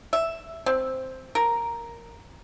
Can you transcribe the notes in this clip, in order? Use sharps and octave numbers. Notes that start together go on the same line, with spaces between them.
E5
C4
A#4